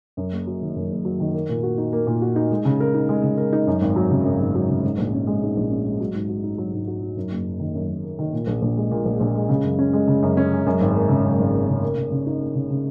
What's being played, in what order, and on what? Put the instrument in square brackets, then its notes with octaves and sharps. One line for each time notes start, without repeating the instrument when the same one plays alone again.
[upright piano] F#2
F#1
F#3
D#3
F#2
F#1
F#3
D#3
A#3
A#2
F#4
D#4
A#3
A#2
F#4
D#4
G#3
C#3
A#4
D#4
G#3
C#3
A#4
D#4
F#2
G#1
F#3
C#3
F#2
G#1
F#3
C#3
G#2
A#1
C#4
G#3
G#2
A#1
C#4
G#3
F#3
G#2
F#4
D#4
F#3
G#2
F#4
D#4
F#2
F#1
A#3
D#3
F#2
F#1
A#3
D#3
A#2
A#1
A#1
G#3
A#2
A#1
A#1
G#3
C#3
F#2
C#4
G#3
C#3
F#2
C#4
G#3
F#2
G#1
A#3
C#3
F#2
G#1
A#3
C#3
A#3
C#3
C#3
D#4
A#3
C#3
C#3